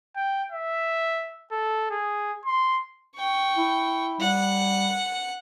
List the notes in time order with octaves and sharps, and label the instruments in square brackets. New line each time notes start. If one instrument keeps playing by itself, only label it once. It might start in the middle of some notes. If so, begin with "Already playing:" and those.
[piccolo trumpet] G5
E5
A4
G#4
C6
[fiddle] G5 C#6
[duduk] E4
[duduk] G3 [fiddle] F#5